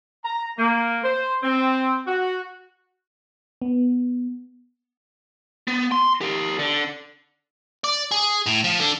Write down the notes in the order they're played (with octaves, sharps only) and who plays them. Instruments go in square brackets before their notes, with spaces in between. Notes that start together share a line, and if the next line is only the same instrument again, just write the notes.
[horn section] A#5
A#3
C5
C4
F#4
[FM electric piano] B3
[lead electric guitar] B3
C6
G4 A#4
D3
[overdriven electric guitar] D5
G#4
A2
F3
D3